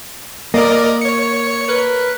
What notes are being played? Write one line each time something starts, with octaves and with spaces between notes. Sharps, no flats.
A#3 A#4 D5 D#5
C#5 C#7
A#4 B4